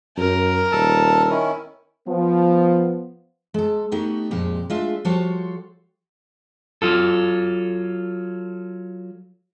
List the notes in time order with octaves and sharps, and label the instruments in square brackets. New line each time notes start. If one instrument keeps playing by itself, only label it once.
[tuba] F#2 [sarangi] A#4
[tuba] D#1 [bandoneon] A4 A5
[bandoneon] D#3 C#4 E4
[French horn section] F3 B3
[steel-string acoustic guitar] G#3 A4
A3 B3 D#4 F#4 G4
F2 A#2 G#3 G4
G#3 A3 D4 F4 E5
F3 G3 F#4 A4 C5 C#5
[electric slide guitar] F#3 F4 A4